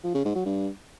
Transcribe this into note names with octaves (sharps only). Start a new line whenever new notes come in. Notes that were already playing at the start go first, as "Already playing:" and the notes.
F3
C#3
G#2
F#3
G2